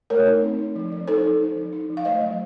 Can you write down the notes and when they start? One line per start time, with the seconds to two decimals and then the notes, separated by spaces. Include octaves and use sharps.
0.10 A3 A#4 C#5
0.27 D#4
0.42 C4
0.59 D#4
0.76 F3
0.91 F3
1.08 D#4 A4 C5
1.24 D#4
1.41 D#4
1.56 F3
1.72 D#4
1.90 F3
1.97 F5
2.05 A3 C5 D#5
2.21 F#3